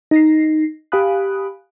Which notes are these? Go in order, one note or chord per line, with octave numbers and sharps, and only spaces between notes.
D#4 A#6 C7
G4 F5 G#5 B5 D#6 F#6